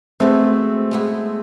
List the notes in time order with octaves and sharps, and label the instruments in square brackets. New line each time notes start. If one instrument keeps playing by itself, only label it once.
[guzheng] B2 G#3 B3 E4 [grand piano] A3 C4
[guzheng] B2 G#3 B3 E4